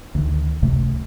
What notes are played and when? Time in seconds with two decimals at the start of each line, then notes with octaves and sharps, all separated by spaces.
0.15 D2 D#3
0.62 F#1 C#2 C3 A3